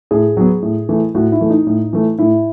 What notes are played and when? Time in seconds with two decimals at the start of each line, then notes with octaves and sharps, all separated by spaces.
0.11 A2 G#4
0.37 F#3 B3
0.62 A2
0.89 E3 A3
1.15 A2 F#4
1.32 E4
1.41 E3 A3
1.50 D#4
1.67 A2
1.93 E3 A3
2.19 A2 E4